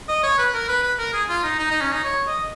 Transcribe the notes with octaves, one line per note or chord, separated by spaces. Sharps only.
D#5
C#5
B4
A#4
B4
B4
A#4
G#4
F4
D#4
D#4
D#4
C#4
D#4
C#5
D#5